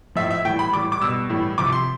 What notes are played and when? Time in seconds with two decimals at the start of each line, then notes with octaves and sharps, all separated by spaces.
0.16 A2 F3 E5
0.31 E5
0.45 A2 E3 G3 G5
0.59 B5
0.73 A2 E3 G3 D6
0.92 D6
1.01 B2 G3 E6
1.30 A2 E3 G3
1.58 C3 F3 D6
1.73 C6